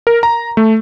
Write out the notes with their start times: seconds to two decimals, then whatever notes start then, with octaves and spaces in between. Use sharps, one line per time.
0.07 A#4
0.23 A#5
0.57 A3